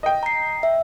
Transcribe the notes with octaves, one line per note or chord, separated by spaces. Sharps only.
D#5 G5
A#5 C7
E5